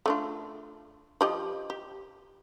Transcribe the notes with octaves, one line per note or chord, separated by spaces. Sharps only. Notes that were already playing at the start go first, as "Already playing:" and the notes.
A3 D4 F4
F3 G4 D#5
G4